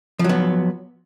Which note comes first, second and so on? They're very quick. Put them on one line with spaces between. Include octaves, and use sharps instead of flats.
F3 F#3 B3